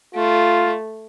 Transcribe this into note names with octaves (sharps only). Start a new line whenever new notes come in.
A3 F4